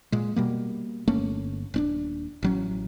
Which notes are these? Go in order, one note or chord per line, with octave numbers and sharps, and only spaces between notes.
A#2 G#3
B2 G3 A#3
G1 A3 A#3 C#4
D#1 C#4 D4
A1 F#3 C#4